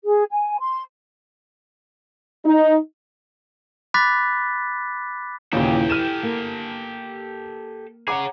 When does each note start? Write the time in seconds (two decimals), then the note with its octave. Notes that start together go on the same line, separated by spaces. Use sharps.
0.04 G#4
0.32 G#5
0.59 C6
2.45 D#4
3.94 B5 D6 F#6 A6 B6
5.53 D#2 A#2 C#3 E3 G4 A4
5.90 F6 D#7 E7
6.23 A#3
8.08 G#4 C#5 F#5 A#5 D6